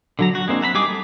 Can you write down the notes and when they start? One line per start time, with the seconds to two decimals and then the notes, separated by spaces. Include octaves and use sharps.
0.19 D3 F#3 A#5
0.35 F#4
0.48 G#3 A#3 C4 D4
0.61 E5 F#5 A#5 B5
0.74 G3 D#4 G#4 D6
0.88 A3